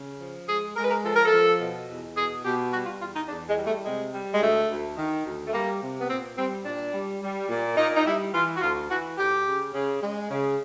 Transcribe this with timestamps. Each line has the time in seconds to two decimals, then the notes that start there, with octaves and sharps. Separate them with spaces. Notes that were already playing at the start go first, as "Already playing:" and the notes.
Already playing: C#3
0.20 F3
0.48 G#3 G#4
0.76 G#3 A#4
0.83 B4
0.90 A#4
1.03 F3 A4
1.15 A#4
1.25 A4
1.32 F3
1.60 B2
1.88 E2
2.15 B2 G#4
2.44 B2 G4
2.72 G3 F#4
2.86 F4
3.00 E2 F4
3.14 D#4
3.28 E2 D4
3.47 G#3
3.57 G3
3.66 A3
3.84 C3 G#3
4.13 G3
4.33 G#3
4.40 D2 A3
4.68 D2
4.96 D#3
5.24 D2
5.47 A3
5.52 G3 A#3
5.81 C3
5.99 B3
6.09 A#2 C4
6.36 G3 C4
6.65 A#2 D4
6.92 G3
7.21 G3
7.49 A#2
7.77 A#2 D#4
7.95 D#4
8.05 G3 E4
8.33 E3 F4
8.56 F#4
8.60 D2 F4
8.89 E3 F#4
9.17 D2 G4
9.45 C#3
9.73 C#3
10.01 G#3
10.29 C#3